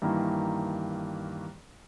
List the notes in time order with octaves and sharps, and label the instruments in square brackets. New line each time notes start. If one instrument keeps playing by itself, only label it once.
[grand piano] G2 D#3 E3 A#3